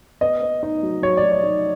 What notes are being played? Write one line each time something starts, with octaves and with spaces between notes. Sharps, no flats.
B3 D#5
B3
D#4
F#3
F#3 C#5
D5
F#3
C#5
D#4